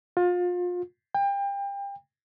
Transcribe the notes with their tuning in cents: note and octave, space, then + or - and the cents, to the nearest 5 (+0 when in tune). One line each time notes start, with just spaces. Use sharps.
F4 +30
G5 +30